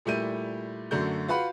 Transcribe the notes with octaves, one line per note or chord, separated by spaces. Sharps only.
A#2 G3 A3 E4 G6 D#7
F#2 D3 A3 F#4 G6
F4 F#4 B4 F5 F#5 B5